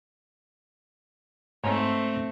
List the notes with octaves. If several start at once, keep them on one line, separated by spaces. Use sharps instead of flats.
G#2 A3 C4 C#5 F5